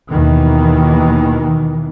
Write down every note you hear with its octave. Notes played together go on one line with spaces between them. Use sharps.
D#2 B2 D#3 E3